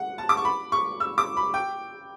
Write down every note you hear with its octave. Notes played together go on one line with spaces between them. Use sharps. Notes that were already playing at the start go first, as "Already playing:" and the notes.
Already playing: F#5
A5
D6
C#6
B5
C#6
E6
D6
B5
G5